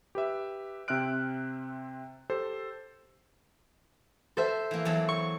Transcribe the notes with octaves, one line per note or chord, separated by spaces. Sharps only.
G4 B4 E5
C3 C4 E5 F6 F#6 D7
G4 A4 C5
A4 C5 E5
E3 A#3
E2 F#3 A5
C#6